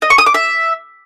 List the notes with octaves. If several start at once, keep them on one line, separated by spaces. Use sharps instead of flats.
D#5
C#6
D#6
D6
E5